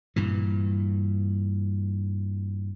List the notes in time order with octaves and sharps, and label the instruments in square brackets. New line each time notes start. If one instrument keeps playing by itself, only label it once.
[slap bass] G2 A#2 E3